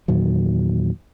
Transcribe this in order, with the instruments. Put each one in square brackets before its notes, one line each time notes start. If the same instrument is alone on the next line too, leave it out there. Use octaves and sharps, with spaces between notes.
[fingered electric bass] E2 A#2 D#3 F#3